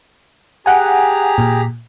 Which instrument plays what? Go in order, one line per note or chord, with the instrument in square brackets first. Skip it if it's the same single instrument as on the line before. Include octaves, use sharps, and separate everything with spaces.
[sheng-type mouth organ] G4 G#4 A#5 [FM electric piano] F#5 G#5
[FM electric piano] A#2